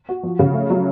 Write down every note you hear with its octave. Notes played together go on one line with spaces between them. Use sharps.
F#4
F3
C#3
A3
F#3